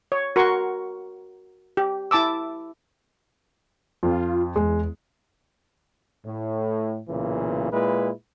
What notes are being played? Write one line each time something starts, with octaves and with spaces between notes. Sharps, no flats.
C#5
F#4 A#4 C6 C#6
G4
E4 A5 D6 E6
F2 F4
E2 G#3
A2
B1 A#2 C#3 E3
A#2 G#3 E4 B4